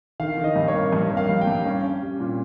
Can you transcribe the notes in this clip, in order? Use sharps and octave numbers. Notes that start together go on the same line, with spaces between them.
D#3 F5
D#3
D#5
G2
C#5
A#3
G2
A#3
F5
G2
G5
G2
C#4
C#4
G3
A#2